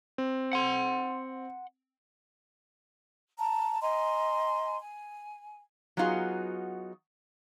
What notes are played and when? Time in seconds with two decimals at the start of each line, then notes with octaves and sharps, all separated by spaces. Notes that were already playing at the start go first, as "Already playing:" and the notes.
0.18 C4
0.53 F#5 C6
3.39 A5 A#5
3.82 D#5 G#5 A#5 C6
4.79 G#5
5.97 F#3 B3 D#4 F4 F#4 G#4